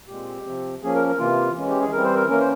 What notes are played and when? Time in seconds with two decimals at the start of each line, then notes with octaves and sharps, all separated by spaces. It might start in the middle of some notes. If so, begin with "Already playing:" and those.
0.08 A#2 G#3 C4 G4
0.46 C3 F3 C4
0.82 F3 A#3 C#4 G#4
0.95 A#4
1.07 A#4
1.19 C3 E3 A#3 F4
1.55 E3 G#3 C#4
1.69 G4
1.80 G#4
1.93 E3 G3 C4 A#4
2.04 C5
2.15 A#4
2.29 E3 A#3 C#4 A#4
2.40 C5